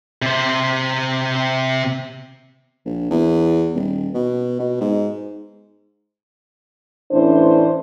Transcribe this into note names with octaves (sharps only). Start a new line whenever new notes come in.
C3 C5
A#1
E2
D#1
B2
B2
G#2
A2 E3 C#4 D4 C5